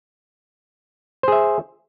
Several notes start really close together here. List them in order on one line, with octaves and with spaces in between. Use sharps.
C5 G#4 E5